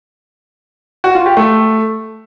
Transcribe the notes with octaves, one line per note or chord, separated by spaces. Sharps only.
F#4
F4
G4
A3